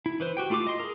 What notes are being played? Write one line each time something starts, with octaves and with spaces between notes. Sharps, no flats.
E4
E3 B4 C5
F#4 G4 G5
A3 E4 F4 G4 D6
D#5 C6
G#4 A#4